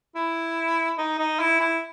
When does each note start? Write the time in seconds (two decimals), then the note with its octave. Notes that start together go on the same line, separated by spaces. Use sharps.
0.15 E4
0.98 D#4
1.19 D#4
1.39 E4
1.60 E4